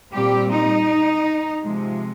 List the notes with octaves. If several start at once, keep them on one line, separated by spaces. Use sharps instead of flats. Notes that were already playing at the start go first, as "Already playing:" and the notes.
A#2 G3 C4 G4
D#4
C3 F3 G#3